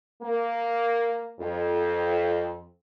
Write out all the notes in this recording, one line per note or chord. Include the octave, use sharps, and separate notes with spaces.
A#3
F2